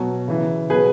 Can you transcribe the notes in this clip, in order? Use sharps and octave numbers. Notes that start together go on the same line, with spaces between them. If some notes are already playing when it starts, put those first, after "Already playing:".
Already playing: B2 F#3
C#3 E3
B2 F#3 G#4 B4